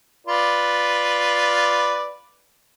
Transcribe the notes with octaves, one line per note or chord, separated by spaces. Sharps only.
F4 B4 D5